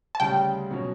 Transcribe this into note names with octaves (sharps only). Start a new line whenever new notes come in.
A5
D2 C#3 G3 G5
B2 F#3 C#4